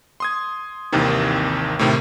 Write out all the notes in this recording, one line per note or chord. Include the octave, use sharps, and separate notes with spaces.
C6 D#6 G#6
G#1 D#2 C3 D#3 E3
A2 C3 D#3